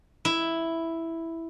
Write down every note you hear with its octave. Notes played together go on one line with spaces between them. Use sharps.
E4